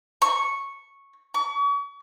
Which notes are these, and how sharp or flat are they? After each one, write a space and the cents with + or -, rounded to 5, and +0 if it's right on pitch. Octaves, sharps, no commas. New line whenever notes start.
C#6 -5
C#6 +40